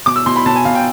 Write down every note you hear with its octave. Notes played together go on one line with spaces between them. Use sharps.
B2 D6
E6
B2 C6
B5
B2 A5
G#5
B2 F5
G5